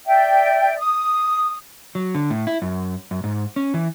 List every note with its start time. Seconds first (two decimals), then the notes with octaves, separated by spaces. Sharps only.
0.06 D5 E5 G5
0.78 D#6
1.95 F#3
2.15 D3
2.30 A2
2.47 E4
2.62 F#2
3.11 F#2
3.24 G#2
3.56 C#4
3.74 E3